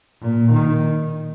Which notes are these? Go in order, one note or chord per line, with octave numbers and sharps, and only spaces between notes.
A#2
D#3